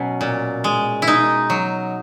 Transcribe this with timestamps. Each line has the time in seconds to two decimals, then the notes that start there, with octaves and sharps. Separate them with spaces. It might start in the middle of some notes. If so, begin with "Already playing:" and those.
Already playing: B2 F#3 C#4
0.21 A#2
0.64 G#3
1.02 E4
1.07 B2 D#4
1.50 F#3